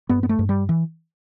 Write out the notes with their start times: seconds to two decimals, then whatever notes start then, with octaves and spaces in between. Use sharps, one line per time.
0.09 G2 B3
0.23 B3
0.29 A3
0.39 G2
0.49 G3
0.69 E3